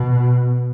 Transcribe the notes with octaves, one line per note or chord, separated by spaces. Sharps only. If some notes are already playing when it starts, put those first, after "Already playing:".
Already playing: B2